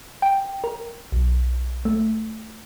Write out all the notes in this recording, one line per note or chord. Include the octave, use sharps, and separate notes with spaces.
G5
A#4
B1
A3